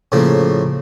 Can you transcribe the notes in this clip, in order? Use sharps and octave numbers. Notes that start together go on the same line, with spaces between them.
A2 C#3 F3 A#3